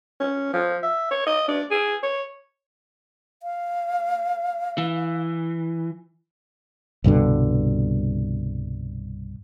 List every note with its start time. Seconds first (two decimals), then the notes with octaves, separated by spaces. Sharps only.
0.20 C#4
0.53 F3
0.83 E5
1.11 C#5
1.27 D#5
1.48 D4
1.71 G#4
2.03 C#5
3.43 F5
4.78 E3
7.04 C2 G2 B2 D3